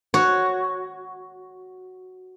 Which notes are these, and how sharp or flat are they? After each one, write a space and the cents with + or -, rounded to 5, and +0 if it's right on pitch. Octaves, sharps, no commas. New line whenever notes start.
F#4 +0 C#5 +0